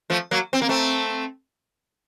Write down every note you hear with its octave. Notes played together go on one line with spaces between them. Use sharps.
F3 A3
F#3 A#3
C4
A#3
A3 C4